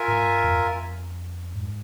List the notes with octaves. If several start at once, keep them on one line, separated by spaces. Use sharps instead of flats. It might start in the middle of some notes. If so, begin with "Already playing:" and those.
Already playing: F4 A#4 E5 G#5
G#2
G2
F2
G#2